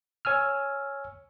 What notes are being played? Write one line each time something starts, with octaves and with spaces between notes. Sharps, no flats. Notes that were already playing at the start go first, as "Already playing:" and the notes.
C#5 G#5 E6 F6